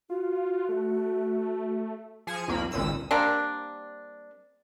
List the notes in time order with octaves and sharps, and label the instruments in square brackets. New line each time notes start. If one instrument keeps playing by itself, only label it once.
[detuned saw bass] F4 [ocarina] F#4
[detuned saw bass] A3
[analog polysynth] F3 G#4 G#5 C#7 D#7 E7
C2 F2 A#3 B5
G#1 C#2 A#2 D#6 E6 E7
[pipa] G3 A#3 C4 D4